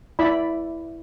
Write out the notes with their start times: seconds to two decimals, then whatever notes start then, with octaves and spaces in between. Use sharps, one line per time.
0.19 E4 D5 B5